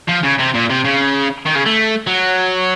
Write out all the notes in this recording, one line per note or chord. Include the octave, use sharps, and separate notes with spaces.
F3
C#3
C3
A#2
C3
C#3
D#3
C#3
A3
F#3